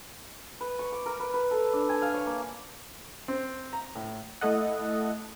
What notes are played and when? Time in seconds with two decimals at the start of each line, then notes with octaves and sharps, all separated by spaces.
0.61 B4
0.79 C#6
0.92 D6
1.06 A#4
1.19 B4
1.34 B4
1.51 A4
1.73 D4
1.89 G#5
2.02 F5
2.14 C#5
2.27 A#3
3.28 C4
3.73 A#5
3.95 A2
4.41 A3 E4 A4 D#5 F#5